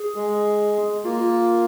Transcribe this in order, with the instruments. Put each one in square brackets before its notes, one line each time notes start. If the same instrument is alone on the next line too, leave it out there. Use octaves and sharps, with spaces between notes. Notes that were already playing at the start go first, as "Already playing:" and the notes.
Already playing: [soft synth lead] G#4
[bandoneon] G#3
[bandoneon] A#3 [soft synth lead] F4